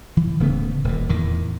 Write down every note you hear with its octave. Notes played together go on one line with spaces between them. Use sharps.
E3
D1 C#3 A3 B3
D#1 A#2
E2 A2 D#3